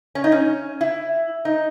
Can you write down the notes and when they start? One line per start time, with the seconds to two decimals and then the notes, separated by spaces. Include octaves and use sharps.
0.15 C#4
0.24 D#4
0.32 C#4
0.81 E4
1.45 D#4